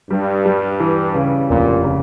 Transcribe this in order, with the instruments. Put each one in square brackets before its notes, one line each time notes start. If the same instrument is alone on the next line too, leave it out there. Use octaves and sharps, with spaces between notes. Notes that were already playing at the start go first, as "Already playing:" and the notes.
[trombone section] G2 [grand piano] G3
[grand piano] G3
E3
C#3
[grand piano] F1 [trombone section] A#2
[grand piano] C#3